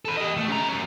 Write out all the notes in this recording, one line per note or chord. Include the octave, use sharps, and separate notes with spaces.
A4 B4
G4 D#5
A3
C#3 A#5
F#3 C#4